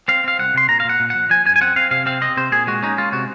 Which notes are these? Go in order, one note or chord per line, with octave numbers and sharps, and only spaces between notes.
C4 F5
C4 F5
C2 F#5
C3 C6
A#2 A#5
F5
A#2 F#5
A#2
F3 F#5
F3 G#5
F#2 G#5
G#5
C4 F#5
C4 F5
C3 F5
C4 F5
C4 D#5
C3 C5
A#2 G#4
G#3 F#4
C#4 D#4
G#3 F4
C3 F#4